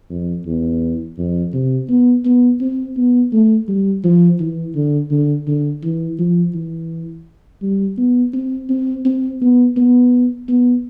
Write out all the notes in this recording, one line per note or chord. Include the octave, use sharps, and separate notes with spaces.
F2
E2
F2
C3
B3
B3
C4
B3
A3
G3
F3
E3
D3
D3
D3
E3
F3
E3
G3
B3
C4
C4
C4
B3
B3
B3